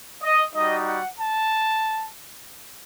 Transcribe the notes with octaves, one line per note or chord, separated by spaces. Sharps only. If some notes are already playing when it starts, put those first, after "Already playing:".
D#5
G3 D#4 F#4 D#5
F#5
A5